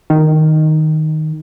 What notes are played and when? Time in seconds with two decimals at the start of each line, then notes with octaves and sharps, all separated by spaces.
0.10 D#3